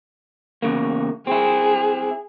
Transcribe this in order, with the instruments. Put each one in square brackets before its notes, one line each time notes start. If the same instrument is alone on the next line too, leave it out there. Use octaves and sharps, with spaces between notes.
[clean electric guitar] E2 C#3 A#3
[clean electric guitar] C4 E4 [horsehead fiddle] G#4